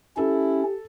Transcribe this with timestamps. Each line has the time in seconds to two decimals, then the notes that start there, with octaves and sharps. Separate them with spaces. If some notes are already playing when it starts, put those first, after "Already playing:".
0.17 C#4 E4 G4 A4